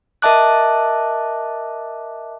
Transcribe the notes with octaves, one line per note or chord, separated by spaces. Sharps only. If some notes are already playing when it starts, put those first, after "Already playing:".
A#4 D#5 E5 A5 D6 F#6